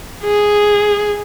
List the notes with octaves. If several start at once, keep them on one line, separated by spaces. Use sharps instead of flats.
G#4